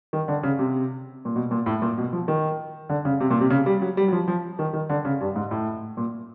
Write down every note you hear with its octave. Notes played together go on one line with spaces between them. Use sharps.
D#3
D3
C#3
C3
A#2
B2
A#2
A2
A#2
B2
F3
D#3
D3
C#3
C3
A#2
C3
C#3
G3
F#3
G3
F#3
F3
F3
D#3
D#3
D3
C#3
G2
G#2
A2
A#2